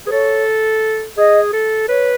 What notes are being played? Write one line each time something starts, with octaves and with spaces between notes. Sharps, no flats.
G#4 B4
A4 C#5
G#4 D#5
A4
B4 C#5